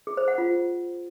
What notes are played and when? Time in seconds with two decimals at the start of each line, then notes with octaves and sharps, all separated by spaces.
0.07 G#4
0.17 C5
0.28 F#5
0.38 F4